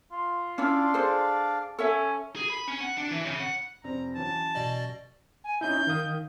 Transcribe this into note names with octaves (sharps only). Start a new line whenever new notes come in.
F4
C#4 D4 E4 C#5 D5 F5
G#4 A4 C5
C#4 A4 C#5 E5
G#4
B5
C#4
F#5
D4
E3
C#3
F#5
F1 C4 D5 A#5
E3 F#3 C#4 A5
B2 D5 D#5
G#5
C#4 D#4 E4 G6
D#3 F5 D#6